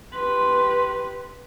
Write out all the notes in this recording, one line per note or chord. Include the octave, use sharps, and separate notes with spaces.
G4 B4 C6